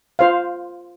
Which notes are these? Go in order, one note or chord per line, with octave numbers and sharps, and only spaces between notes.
F4 C5 F5